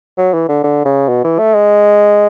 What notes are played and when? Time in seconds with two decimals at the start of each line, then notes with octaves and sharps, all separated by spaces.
0.18 F#3
0.34 E3
0.49 D3
0.63 D3
0.86 C#3
1.09 B2
1.24 E3
1.39 A3
1.54 G#3